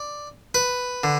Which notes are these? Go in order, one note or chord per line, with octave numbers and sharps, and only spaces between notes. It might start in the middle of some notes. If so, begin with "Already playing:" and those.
Already playing: D5
B4
D3